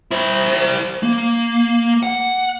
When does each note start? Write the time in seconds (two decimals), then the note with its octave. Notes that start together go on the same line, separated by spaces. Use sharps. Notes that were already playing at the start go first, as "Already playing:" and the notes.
0.11 E4 C5
1.03 A#3
2.03 F#5